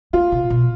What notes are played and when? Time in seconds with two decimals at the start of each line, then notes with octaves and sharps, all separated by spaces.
0.13 B3 F4
0.32 C3
0.50 B2